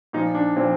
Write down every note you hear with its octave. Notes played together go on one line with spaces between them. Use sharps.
A#2 F3 D#4
D4
A#2 F3 C4